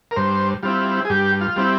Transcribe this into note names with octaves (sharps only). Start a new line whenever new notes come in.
A#4
G2 C5
G3 C4 E4 F4
G#4
G2 G4
F4
G3 C4 E4